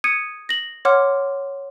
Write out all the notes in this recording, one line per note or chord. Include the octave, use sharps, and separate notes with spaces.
D#6 G#6 C#7 D#7
A#6 F#7
C#5 F#5 C6 D6 F6